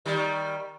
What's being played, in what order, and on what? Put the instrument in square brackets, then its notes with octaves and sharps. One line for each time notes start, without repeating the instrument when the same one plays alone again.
[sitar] D#3 G3